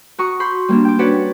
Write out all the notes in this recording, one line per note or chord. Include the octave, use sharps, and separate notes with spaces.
F#4 A#5 C#6 D#6
B5 C6 G6
G3 A#3 D4
G5 D6
C#4 D4 F#4 B4 C#5 D5